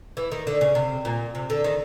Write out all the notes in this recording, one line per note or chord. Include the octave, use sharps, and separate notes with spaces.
E3
D#3
D3
C#3
C3
A#2
C3
D3
D#3